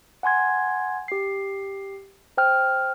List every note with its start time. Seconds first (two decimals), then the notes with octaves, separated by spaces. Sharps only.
0.23 F#5 G#5 C6 G#6
1.08 G4 C7
2.37 C5 G5 F6